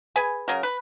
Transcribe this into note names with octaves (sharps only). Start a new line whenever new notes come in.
G#4 B4 G#5
C#3 F#3 A#4
B4